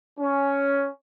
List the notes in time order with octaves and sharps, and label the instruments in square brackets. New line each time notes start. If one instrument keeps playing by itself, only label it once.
[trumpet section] C#4